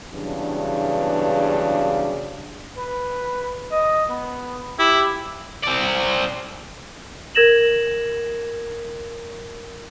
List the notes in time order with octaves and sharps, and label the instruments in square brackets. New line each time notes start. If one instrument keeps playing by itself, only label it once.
[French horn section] E2 G2 C#3 E3 F#3 D4
[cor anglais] B4
D#5
B3
[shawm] E4 [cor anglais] G4
[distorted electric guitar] C4 D5
[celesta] A#4 G#6 A#6 E7 F#7